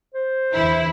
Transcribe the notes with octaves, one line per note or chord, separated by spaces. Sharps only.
C5
E2 D3 E3 E4